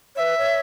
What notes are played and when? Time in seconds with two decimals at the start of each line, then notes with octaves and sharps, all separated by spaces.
0.15 B4 C#5 E5
0.38 C#5